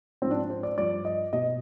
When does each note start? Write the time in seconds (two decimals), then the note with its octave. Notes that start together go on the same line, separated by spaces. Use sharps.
0.22 G#2 F3 C4
0.31 D4
0.50 C5
0.63 D5
0.78 G2 F3 D5
1.05 D#5
1.33 B2 D#5